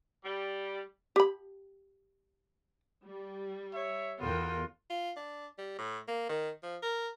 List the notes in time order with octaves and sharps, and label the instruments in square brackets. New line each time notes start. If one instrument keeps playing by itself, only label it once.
[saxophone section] G3
[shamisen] G4 B5
[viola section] G3
[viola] C#5 [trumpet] E5
[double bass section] E2 [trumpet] B3 [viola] F4 F#4 [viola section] A4 A#4 G5
[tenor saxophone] F4
D4
G3
A2
A#3
D#3
F3
A#4